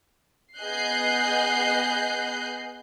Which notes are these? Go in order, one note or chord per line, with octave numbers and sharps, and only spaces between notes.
B3 G#4 D#5 F#6 G6 C7